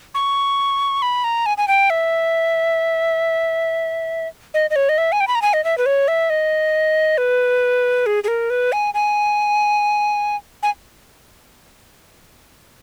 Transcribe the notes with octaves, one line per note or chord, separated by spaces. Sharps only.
C#6
B5
A#5
G#5
G#5
G5
E5
D#5
D#5
C#5
D#5
E5
G#5
G5
B5
A#5
G#5
D#5
E5
B4
C#5
E5
D#5
B4
G#4
G#4
A#4
B4
G#5
G#5
G#5